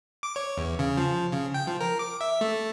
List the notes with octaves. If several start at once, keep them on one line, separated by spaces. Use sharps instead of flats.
D6
C#5
E2
C#3
F3
C#3
G5
F3
A#4
D6
E5
A3